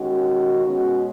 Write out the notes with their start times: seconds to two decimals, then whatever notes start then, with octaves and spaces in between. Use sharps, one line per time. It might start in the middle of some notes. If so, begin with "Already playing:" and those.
Already playing: D#2 D#3 G#3 C#4 F#4
0.64 B2 G#3 B3 C#4 F#4